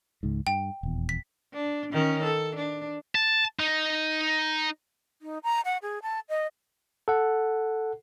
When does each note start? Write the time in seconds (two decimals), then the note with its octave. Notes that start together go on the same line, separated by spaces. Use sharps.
0.23 C#2 G#2
0.47 G2 G5
0.83 D#1 E2
1.09 B6
1.54 D4
1.93 D#3 C#4
2.24 A4
2.56 D4
3.15 A5
3.59 D#4
5.22 D#4
5.44 A#5
5.65 F#5
5.82 G#4
6.02 A5
6.29 D#5
7.08 A4 F#5